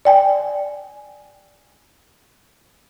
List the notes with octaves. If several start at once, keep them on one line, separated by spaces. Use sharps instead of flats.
D5 G5 G#5